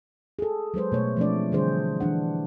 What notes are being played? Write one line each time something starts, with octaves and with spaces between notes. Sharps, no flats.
G#4 A4
F#3 G#3 B4 C5
B2 A3 C#5
F3 G#3 A3 C4 D4 D5
D3 E3 G3 D4 G#4 C5
E3 D4 F#5